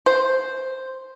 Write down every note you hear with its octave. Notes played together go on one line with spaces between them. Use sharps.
C5